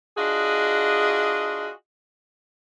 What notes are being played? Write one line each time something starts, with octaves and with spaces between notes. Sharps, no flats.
D4 F4 F#4 G#4 D#5